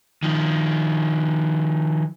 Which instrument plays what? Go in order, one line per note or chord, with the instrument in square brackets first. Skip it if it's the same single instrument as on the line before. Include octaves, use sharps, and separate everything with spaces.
[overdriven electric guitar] D#3 F3